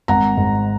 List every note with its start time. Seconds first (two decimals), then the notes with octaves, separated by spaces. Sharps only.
0.08 G#1 F#5 A#5
0.37 G#2